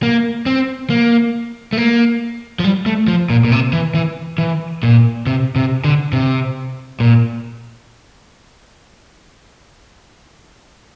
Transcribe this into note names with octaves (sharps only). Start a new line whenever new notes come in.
A#3
C4
A#3
A3
A#3
F3
G3
A3
F3
A#2
A#2
C3
E3
E3
E3
A#2
C3
C3
D3
C3
A#2